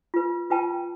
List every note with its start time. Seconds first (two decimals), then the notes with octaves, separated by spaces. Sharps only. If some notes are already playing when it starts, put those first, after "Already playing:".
0.14 F4 B4
0.50 F4 B4 G5 A5